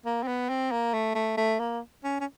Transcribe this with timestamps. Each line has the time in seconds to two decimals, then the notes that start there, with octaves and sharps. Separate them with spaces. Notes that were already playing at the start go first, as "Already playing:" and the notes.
0.05 A#3
0.23 C4
0.27 B3
0.49 C4
0.72 A#3
0.94 A3
1.15 A3
1.37 A3
1.60 A#3
2.04 C#4
2.21 C#4